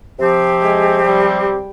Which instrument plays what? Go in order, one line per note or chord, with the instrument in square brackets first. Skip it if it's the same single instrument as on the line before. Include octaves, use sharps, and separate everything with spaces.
[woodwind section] C3 F3 C4 G4
[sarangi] G#3
G3